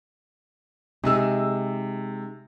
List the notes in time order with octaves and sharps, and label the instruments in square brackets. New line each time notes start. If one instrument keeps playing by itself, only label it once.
[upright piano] C3 E6 [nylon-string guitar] G#3 D#4 G#4